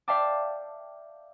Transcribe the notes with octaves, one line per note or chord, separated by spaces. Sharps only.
D5 E5 F5 G5 A5 D6